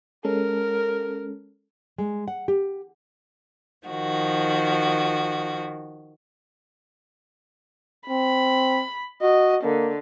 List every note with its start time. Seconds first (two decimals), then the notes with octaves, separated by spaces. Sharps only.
0.25 G#3 C#4 A4 A#4
1.98 G#3
2.28 F#5
2.48 G4
3.86 D#3 F3 F#4
8.09 C4 B5
9.22 F#4 D#5
9.64 D3 A#3